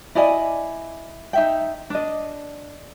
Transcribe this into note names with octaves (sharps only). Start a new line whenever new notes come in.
E4 D5 D#5 G#5
D#4 E5 G5
D4 D#5